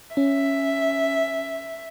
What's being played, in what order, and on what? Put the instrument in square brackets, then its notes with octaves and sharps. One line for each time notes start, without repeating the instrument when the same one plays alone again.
[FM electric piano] C#4 [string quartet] E5